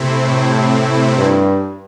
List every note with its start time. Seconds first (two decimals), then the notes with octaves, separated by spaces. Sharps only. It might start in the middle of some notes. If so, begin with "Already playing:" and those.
Already playing: C3 A3 C4 E4
0.25 A2
1.17 G2